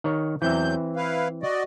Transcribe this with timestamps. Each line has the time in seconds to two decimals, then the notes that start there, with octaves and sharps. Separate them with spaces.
0.04 D#3 C#5
0.42 E2 E3 F#3 C4 E5 G6
0.96 E4 B4 F5
1.43 F#4 D5 D#5